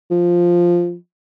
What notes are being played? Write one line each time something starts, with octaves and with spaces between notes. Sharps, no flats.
F3